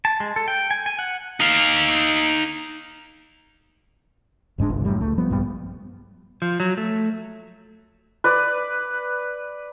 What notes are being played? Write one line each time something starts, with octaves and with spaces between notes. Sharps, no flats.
A5
G#3
A4
G5
G#5
G#5
F#5
D#4 F5
F#1 G#2 G#3 D4
G1 C2
F#2 A2 G3
C#2 A3
F3 G3 B3
A#1 G2 G3 B3
F3
F#3
A3
B4 D5